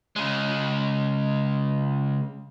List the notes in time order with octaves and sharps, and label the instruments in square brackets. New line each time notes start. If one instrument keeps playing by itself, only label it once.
[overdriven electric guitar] C#3 G#3